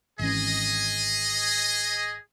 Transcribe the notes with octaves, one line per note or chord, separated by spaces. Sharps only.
G#1 E3 C#4 G#4 D#5